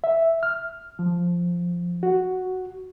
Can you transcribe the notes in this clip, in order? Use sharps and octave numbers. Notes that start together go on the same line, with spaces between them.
E5
F6
F3
F#4